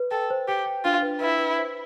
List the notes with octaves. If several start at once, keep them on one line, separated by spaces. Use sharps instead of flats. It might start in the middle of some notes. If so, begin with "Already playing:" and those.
Already playing: B4
A4 G5
C5
G4 G5
G5
D4 F4
B4
E4 B4
B4
C5